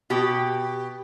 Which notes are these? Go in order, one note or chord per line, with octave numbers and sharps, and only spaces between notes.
B2 G4